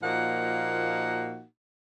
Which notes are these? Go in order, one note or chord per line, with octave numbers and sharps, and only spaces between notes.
A#2 F3 A#3 D#4 F#4 F#5